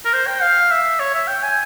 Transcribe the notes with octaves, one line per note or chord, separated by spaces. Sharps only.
A#4
C5
G5
F5
E5
C#5
E5
G5
G#5